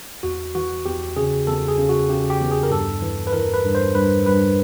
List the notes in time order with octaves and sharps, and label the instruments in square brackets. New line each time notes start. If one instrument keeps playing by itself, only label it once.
[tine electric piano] E2 F#4
E3 F#4
E2 G4
C#3 G#4
E2 A4
G#4
C#3
F#4
C#3 G4
G4
E2
G#4
A#4
G2 A4
E3
B4
E3 A#4
B4
G2
C5
G2 B4
G2 B4